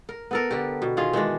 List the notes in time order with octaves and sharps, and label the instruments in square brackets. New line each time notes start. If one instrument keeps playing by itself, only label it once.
[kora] A#4
B3 A4 A#4
D3 G4
B2
D#3 F4 G#4 F5
D#3 E3 G#3 D4